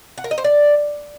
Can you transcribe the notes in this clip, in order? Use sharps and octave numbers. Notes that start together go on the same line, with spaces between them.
F#5
A#4
D#5
C5
D5